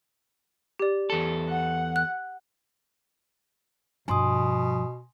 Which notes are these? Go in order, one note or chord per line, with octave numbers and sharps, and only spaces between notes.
G4 D5
E2 A4
F#5
F#6
G2 B2 F3 G#5 C6 D#6